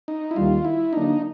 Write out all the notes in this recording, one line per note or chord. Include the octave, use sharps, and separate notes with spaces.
D#4
E4
D#2 D#3 G3 F4
E4
D3 F#3 A#3 D4 D#4